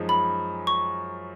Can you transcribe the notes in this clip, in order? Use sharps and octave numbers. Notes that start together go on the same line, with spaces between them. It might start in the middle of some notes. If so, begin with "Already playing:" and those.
Already playing: F#2 F3 G#3 D#4
B5
C#6